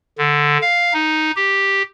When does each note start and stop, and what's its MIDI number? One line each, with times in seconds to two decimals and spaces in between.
0.18 0.58 50
0.61 0.93 77
0.94 1.31 63
1.36 1.83 67